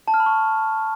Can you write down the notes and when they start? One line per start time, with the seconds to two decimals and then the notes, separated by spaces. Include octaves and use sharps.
0.08 A5
0.14 F6
0.20 B5
0.26 C#6